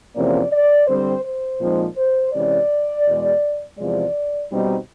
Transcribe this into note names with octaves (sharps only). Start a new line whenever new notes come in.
E2 C3 F3 A#3 C#4 D5
D5
D3 G3 C4 C5
C5
A#2 F3 G#3 C4 D#4
C5
C3 E3 G#3 C#4 D5
E2 B2 G#3
E2 C3 F3 G#3 D5
B2 G3 C4 D#4